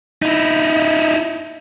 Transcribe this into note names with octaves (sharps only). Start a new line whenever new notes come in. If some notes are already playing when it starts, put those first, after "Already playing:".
D#4 E4